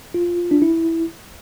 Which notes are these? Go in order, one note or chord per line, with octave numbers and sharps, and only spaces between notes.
F4
D4
E4